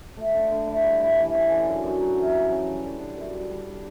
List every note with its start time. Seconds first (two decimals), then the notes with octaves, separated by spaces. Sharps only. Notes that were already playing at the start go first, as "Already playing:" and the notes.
0.17 A3
0.34 D3
0.51 D3
0.67 E4
0.84 G3
1.00 E4
1.18 E3
1.34 C#4
1.51 D3
1.67 F#2
1.84 F#2
2.00 F#3
2.17 E3
2.34 C#3
2.51 C#3
2.67 G3
2.84 D3
3.00 D4
3.17 F#2
3.34 G3
3.51 G3
3.68 D4